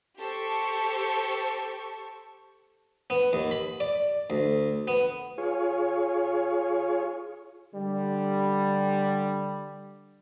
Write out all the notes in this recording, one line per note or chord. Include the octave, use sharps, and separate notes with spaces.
G4 A4 C5 C#6
B3
D#2
B5
D5
D2
B3
F4 G#4 C#5
D3 G3